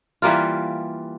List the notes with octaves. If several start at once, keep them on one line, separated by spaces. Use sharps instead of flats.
E3 G3 A#3 F4